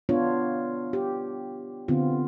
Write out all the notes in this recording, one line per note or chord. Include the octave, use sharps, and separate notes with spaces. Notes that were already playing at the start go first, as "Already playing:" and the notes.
B3 D4 F4 C#5
G4
D3 B3 C4 F4